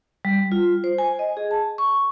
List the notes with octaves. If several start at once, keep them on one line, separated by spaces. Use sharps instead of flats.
G3
F4
C5
G#5
D#5
G#4
A5
C#6